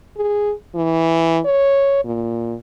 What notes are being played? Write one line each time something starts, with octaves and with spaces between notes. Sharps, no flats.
G#4
E3
C#5
A#2